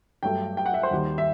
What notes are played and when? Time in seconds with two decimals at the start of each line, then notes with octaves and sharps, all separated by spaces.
0.23 G2 F#3 A3 G5
0.57 G5
0.66 F#5
0.74 E5
0.83 C5
0.91 D#2 D#3 G3
1.18 E5